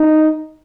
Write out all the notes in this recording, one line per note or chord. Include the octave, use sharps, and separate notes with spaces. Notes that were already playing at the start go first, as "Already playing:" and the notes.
Already playing: D#4